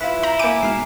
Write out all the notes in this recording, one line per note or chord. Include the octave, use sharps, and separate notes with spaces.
E4 F4 B4 B6
A#5 G6 E7
A#3 G#5 A#5 D6 D7
G#2 B2 F6 C7